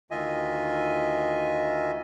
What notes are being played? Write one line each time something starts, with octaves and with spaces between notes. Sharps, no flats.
D2 D#3 F4 D#5 E5 G#5